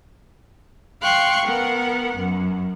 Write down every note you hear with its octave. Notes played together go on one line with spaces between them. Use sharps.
F5 G5 C6 C#6 F#6
B3 A#4 F#5
F#2